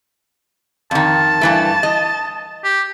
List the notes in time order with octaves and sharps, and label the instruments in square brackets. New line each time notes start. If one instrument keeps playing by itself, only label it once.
[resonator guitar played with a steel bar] F2 D#3 [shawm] A5
[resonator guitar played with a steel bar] G2 E3 A3
D#5
[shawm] G4